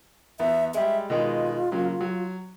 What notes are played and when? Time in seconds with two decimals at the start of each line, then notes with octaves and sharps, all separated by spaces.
0.40 E2 B3 E5
0.74 G3 G#3 E5
1.10 B2 D#3 G#3 F4
1.71 C#3 F#3 A#3
2.01 F#3